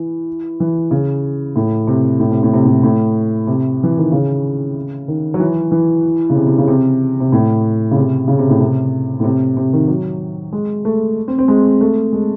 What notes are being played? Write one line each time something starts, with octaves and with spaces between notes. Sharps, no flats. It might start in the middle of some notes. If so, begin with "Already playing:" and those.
Already playing: E3
E3
C#3
A2
C3
A2
C3
A2
C3
A2
A2
C3
E3
D#3
C#3
D#3
F#3
E3
E3
C#3
C3
C3
C#3
C3
C3
A2
C#3
C3
C#3
C3
A2
C3
A2
C3
C3
D#3
F#3
G#3
A3
C4
C4
G#3
A3
G#3